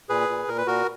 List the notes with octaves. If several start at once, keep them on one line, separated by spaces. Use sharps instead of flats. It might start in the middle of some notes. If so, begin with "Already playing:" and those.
A#2 G#4 B4
A#2
A#2 A#4
B4
A#2 F#4 A#4